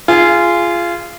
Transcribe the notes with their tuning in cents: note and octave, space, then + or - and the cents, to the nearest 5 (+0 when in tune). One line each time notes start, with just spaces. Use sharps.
F4 -20 G#4 +0